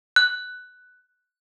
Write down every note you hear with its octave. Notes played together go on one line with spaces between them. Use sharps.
F#6